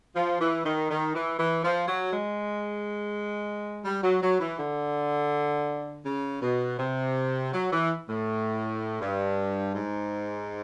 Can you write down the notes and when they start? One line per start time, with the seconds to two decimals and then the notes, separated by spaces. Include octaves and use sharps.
0.15 F3
0.39 E3
0.64 D#3
0.89 D#3
1.14 E3
1.37 E3
1.63 F3
1.87 F#3
2.11 G#3
3.83 G3
4.02 F#3
4.21 F#3
4.39 E3
4.58 D3
6.04 C#3
6.41 B2
6.78 C3
7.53 F#3
7.71 E3
8.08 A2
9.00 G2
9.73 G#2